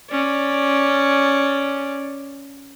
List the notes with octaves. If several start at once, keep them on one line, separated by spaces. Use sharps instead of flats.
C#4 D5